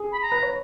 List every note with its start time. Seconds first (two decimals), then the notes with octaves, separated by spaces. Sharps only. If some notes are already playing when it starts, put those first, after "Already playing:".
Already playing: G#4
0.12 B5
0.22 A#5
0.32 B4
0.43 C#5